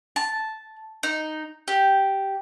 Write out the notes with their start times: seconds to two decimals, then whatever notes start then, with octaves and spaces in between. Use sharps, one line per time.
0.16 A5
1.03 D#4
1.68 G4